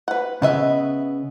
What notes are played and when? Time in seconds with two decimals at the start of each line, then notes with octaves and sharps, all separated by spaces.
0.08 B4 F#5
0.42 C#3 B3 D#5 E5